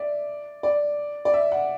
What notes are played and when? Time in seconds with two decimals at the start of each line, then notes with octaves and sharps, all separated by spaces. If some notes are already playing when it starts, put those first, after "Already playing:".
Already playing: D5 E5
0.63 D5
1.25 D5
1.34 E5
1.52 F#5